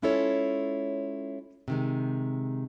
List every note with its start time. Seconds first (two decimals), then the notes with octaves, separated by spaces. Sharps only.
0.02 G#3 C#4 E4 F4 A4 C#5
1.68 C3 D#3 G#3